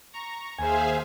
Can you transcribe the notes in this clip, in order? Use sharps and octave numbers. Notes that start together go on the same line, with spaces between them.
A#5 C#6
D#2 G#4 C5 E5 F5 G#5